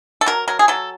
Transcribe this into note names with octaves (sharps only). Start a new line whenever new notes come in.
A4
F#3 A#4
F#3 A#4
G#4
F#3 A4